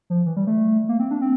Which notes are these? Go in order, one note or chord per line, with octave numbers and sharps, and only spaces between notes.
F3
E3
G3
A3
A#3
C4
D4
C4